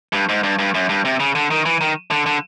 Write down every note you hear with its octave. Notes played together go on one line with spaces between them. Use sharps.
G2
G#2
G2
G2
F#2
G2
C3
C#3
D3
D#3
E3
D#3
D3
D3